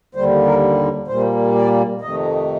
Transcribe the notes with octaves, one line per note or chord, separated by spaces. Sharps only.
D#2 D3 G3 C5
A#4
A#2 G3 A#3 C5
D5
F2 C3 D#3 A3 D#5